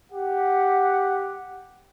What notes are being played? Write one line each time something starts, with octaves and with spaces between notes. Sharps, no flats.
G4 F#5